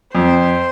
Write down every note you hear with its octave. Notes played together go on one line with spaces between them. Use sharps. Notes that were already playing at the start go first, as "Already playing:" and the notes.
F2 C5